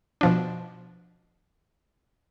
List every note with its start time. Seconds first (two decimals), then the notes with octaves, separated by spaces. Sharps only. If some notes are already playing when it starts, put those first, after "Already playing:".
0.21 B2 F3 D4